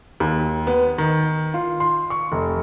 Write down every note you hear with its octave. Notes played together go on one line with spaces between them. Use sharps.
D#2
B3
D#3
F4
C6
C#6
F1